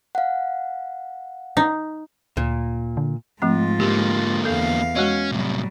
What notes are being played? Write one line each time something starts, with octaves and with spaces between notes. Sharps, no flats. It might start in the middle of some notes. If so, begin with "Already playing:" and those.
F5 F#5
D#4
D2 A#2
D3
G#2 F3 A3 C4 F4
D3 A#3 G4
E2 A4 F5
G#3 C#4 F#4 D#5
A2 C3 F#3 G3